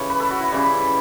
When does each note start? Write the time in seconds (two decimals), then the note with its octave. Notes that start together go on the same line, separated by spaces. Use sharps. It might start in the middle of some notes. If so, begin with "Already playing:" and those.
Already playing: C#3 E3 G3 C#5
0.10 B4
0.20 A4
0.30 F#4
0.41 E4
0.52 C#3 E3 G3